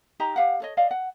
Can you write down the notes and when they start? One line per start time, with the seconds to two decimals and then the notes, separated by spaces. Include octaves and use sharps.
0.20 D#4 G4 D#5 A#5
0.36 G4 F5 F#5
0.60 A4 C#5 D#5
0.77 D5 D#5 F5
0.91 F#5